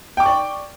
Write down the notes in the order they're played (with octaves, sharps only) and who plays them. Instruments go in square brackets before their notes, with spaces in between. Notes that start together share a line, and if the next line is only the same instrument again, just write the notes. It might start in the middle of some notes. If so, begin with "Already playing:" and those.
[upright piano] G5
D6
C#6
D5